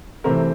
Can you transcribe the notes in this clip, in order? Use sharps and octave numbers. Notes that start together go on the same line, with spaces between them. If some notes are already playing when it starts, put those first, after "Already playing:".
C3 E3 A3 C4 A#4